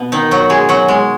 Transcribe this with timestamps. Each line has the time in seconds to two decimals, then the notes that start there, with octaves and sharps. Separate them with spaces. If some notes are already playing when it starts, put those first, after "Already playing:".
Already playing: B2 B3
0.12 D#3 D#4
0.31 F#3 F#4
0.49 G#3 G#4
0.69 F#3 F#4
0.88 G#3